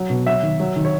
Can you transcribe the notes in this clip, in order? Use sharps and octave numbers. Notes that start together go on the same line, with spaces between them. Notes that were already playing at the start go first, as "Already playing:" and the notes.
Already playing: F#3
B2
F#3 E5
D#3
F#3
D#3
C#5